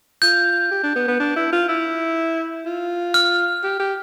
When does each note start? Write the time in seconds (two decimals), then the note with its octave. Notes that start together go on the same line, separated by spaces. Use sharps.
0.22 F4 G6
0.71 G4
0.83 D4
0.95 B3
1.08 B3
1.19 D4
1.36 E4
1.52 F4
1.68 E4
2.65 F4
3.14 F6
3.63 G4
3.79 G4